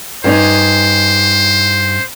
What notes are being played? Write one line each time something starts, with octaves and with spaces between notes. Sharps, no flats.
G2 C#4 D#4 C5